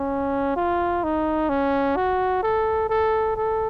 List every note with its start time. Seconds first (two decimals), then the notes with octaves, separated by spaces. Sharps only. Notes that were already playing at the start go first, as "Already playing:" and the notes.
Already playing: C#4
0.56 F4
1.04 D#4
1.49 C#4
1.96 F#4
2.43 A4
2.89 A4
3.36 A4